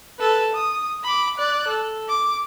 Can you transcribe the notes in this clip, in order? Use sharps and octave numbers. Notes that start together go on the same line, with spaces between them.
A4 B4
D#6
B5 D6
D5 F#6
A4
D6